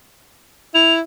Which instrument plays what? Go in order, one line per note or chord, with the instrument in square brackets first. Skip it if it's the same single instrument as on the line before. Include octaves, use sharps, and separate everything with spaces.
[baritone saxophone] E4 [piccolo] F7